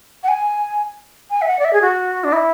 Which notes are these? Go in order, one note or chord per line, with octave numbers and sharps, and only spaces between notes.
F#5
G#5
G#5
E5
F#5
D5
E5
G#4
F#4
D4
E4